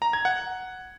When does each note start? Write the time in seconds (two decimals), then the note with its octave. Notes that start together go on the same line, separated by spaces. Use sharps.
0.02 A#5
0.13 G#6
0.25 F#5